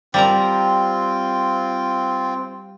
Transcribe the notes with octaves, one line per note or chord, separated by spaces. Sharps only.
G3 C4 F4 A#4 A#5